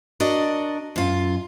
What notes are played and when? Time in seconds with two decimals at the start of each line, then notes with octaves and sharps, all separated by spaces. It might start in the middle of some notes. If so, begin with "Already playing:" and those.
0.20 D4 F#4 A#4 D5 D#5
0.96 F#2 F4